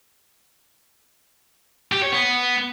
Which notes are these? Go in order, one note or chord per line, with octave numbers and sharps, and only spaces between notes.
G4
C#5
B3